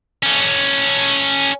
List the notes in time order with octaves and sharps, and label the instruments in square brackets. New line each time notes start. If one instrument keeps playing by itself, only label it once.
[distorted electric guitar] C#4 A4